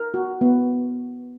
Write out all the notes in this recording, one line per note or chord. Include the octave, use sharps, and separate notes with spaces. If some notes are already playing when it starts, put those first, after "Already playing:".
Already playing: A#4
F#4
B3